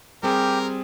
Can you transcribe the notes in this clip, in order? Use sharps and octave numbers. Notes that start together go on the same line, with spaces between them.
G3 C4 G4 G#4 A#4